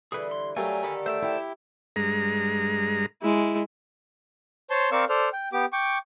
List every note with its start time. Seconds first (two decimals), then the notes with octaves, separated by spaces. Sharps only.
0.12 D3 E3 G3 G#4 B4
0.31 C6
0.57 F#3 G3 A3 G4 A#4 F5 G#5
0.83 D3 D#3 A4 B5
1.06 A3 C5 E5 G5
1.23 E4 G4
1.96 G2 G#3 A#5
3.22 G#3 E4
4.70 C5 C#5 A5 C6
4.92 C4 A#4 D5 F5 C#6 E6
5.09 A4 C5 D5 F6
5.33 G5
5.53 B3 G4 D6
5.73 G5 C#6 D6